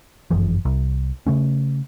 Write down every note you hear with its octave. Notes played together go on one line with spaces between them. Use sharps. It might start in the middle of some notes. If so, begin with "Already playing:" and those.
G1 F#2 E3 F3
C2
C#3 A3 C#4